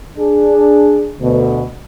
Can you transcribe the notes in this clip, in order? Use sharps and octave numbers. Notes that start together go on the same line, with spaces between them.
D4 G#4
D2 B2